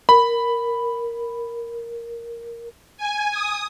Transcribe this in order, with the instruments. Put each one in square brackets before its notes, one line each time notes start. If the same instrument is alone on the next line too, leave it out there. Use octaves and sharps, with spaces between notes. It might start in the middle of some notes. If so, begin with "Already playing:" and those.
[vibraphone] A#4 [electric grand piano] B5
[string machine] G#5
D#6